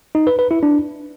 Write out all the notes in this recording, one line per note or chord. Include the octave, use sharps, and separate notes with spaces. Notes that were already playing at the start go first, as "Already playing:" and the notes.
D#4
B4
B4
E4
D4